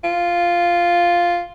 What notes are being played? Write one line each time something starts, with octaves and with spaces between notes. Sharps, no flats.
F4